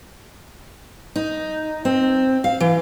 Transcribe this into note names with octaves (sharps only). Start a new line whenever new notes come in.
D#4
C4
F5
E3